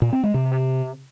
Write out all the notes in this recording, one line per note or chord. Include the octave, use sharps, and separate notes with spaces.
A#2
C4
G#3
C3